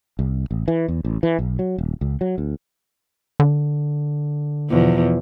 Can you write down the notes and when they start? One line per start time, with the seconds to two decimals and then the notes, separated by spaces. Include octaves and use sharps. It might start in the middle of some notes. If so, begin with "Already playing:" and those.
0.19 C2
0.51 A1
0.68 E3
0.88 E2
1.05 A1
1.23 E3
1.39 B1
1.59 F#3
1.78 D#1
2.01 C#2
2.21 F#3
2.38 D2
3.40 D3
4.70 E2 B2 F3